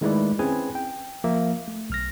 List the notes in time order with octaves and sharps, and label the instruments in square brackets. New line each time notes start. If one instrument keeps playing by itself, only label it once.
[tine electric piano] D#3 G#3 A3 E4 B4 D5
C4 C#4 E4 G#4 B4 G#5
G5
F3 A#3 E5
A3
B1 F6 A#6